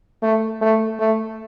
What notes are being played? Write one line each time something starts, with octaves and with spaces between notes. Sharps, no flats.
A3
A3
A3